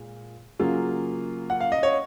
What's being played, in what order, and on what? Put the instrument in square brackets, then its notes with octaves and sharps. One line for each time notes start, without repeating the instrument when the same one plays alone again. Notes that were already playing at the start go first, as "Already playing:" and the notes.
Already playing: [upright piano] A#2 G#3
C#3 F#3 A#3 F4 G#4
[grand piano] F#5
F5
D#5
C#5